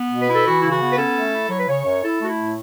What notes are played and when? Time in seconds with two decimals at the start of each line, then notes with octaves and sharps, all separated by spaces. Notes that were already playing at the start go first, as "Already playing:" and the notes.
Already playing: B3
0.11 B2
0.19 B4
0.28 E4
0.35 A4
0.45 E3 F#4
0.60 C#3 E4
0.72 F#4
0.81 B3
0.91 B4
0.97 C#4 A4
1.16 A3
1.32 E4
1.49 F#3 C#5
1.60 B4
1.67 C#3 C#5
1.84 F#2
2.02 E4 A4
2.20 A3 F#4
2.28 E4
2.37 A2